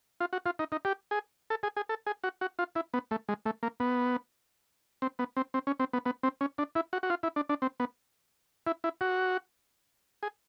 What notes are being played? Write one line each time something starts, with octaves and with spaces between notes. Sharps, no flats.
F4
F#4
F4
D#4
D#4
G4
G#4
A4
G#4
G#4
A4
G#4
F#4
F#4
F4
E4
B3
A3
G#3
A3
A#3
B3
C4
B3
C4
C4
C#4
C4
B3
B3
C4
C#4
D4
E4
F#4
F#4
F4
E4
D4
D4
C4
B3
E4
E4
F#4
G#4